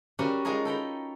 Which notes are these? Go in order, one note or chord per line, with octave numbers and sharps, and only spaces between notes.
G3 C#4 F#4 G4 A#4
G#3 D#4 F4 G#4 A#4
A4 G5 A#5 B5